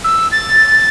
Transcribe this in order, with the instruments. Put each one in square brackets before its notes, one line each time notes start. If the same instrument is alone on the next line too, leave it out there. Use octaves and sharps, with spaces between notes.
[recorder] E6
A6